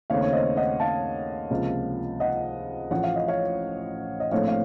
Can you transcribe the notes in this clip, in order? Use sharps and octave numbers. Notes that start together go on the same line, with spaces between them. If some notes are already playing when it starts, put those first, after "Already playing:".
D#2 C#3 A3 C4 C#5 F5
C#5
C5 D#5
D#5 F#5
F5 A5
C#2 C3 F3 A#3
D#5 F#5
A1 A2 F3 F#5
F5
D#5
C#5 F5
D#5
A#1 A2 A3 C4 C#5 F5
F5